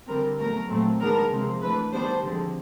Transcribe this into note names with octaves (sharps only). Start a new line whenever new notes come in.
D3 G3 C4 A#4
B2 F#3 A3 A#4
A#2 F#3 A3 C4
D#3 G#3 B3 D4 A#4
C3 F3 G#3 C4
E3 A3 D4 B4
D#3 G3 B3 D4 C5
D3 F3 G#3 C4